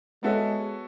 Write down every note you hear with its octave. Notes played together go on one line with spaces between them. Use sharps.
G#3 B3 F#4 A4 C#5 E5